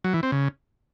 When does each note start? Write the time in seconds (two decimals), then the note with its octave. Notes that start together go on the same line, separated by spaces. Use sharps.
0.04 F#3
0.14 E3
0.23 C4
0.32 C#3